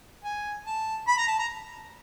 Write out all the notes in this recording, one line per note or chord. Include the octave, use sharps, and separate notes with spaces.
G#5
A5
B5
A#5
A5
A#5